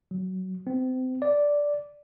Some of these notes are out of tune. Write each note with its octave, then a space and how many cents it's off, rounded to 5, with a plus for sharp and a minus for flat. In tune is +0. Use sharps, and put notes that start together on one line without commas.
F#3 +15
C4 -30
D5 -5